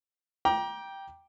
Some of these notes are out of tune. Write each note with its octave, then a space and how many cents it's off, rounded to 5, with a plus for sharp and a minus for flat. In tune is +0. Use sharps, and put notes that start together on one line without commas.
G5 +0 A#5 +30 D6 +0